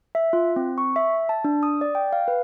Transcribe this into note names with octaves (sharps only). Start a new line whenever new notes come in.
E5
F4
C4
C#6
E5
A5
D4
D#6
D5
G5
F5
B4